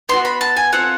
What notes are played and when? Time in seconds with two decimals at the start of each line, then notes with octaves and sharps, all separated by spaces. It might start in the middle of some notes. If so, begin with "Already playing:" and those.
0.09 B3 D4 F#4 C6
0.25 B5
0.41 A5
0.57 G#5
0.72 C4 F4 A4 F#5